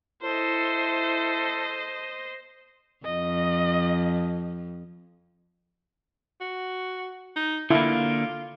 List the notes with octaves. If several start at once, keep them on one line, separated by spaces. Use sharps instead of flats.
E4 A4 C5 D#5
F2 D#5
F#4
D#4
D3 A#3 E4 F4